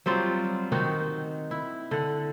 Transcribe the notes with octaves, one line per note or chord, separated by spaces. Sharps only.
F#3 G3 C4 F4
D#3 C4 D#4 F#4
E4
D3 F#5